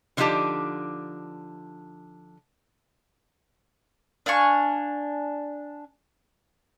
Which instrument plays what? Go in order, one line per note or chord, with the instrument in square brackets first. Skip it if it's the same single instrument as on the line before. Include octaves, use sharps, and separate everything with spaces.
[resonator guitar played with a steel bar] D3 F3 D4 D#4 G4 A5
[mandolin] D4 F5 G#5 C#6